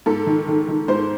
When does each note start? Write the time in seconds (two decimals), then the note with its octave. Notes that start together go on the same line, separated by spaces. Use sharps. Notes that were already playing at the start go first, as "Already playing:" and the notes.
0.06 G#2 A4
0.26 D#3
0.48 D#3
0.68 D#3
0.88 G#2 C5